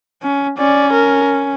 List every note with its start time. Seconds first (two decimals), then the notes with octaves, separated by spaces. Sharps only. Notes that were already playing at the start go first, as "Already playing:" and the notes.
0.23 C#4
0.58 C#4 D5
0.93 A#4